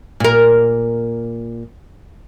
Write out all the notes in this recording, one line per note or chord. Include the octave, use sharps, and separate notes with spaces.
A#2 A#4